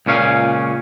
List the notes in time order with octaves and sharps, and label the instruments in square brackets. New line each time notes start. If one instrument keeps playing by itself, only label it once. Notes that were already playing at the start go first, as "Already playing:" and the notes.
[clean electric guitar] C#2 A#2 C#4 F5